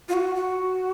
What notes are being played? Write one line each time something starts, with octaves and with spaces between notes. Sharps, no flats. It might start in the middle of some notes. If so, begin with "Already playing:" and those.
F4
F#4
F#4